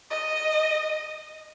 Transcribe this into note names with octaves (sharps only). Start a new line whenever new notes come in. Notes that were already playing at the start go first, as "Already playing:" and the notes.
D#5